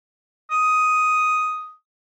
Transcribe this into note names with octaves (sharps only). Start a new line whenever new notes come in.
D#6